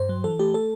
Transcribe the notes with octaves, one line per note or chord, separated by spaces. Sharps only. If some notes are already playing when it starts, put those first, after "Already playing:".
Already playing: G2 C5
F#3
E3 A4
A3 G4
A4